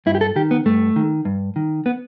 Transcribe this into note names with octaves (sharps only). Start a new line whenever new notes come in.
G2 E4
G4
A4
D#3 G4
B3
G2 A3
D#3
G2
D#3
B3